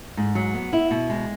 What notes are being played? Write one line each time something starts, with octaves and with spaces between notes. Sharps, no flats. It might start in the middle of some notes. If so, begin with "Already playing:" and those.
G#2
F#3
B3
E4
B2
G#3